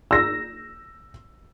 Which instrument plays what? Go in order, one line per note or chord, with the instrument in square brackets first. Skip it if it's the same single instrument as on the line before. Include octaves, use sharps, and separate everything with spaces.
[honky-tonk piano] E6 A#6